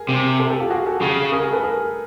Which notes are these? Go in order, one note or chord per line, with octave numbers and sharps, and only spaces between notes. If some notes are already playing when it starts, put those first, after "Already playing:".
Already playing: G#4 A#4
C3
G4 A4
G4 A4
F4 G4
F#4 G#4
G4 A4
C#3
G#4 A#4
G#4 A#4
A4 B4
G#4 A#4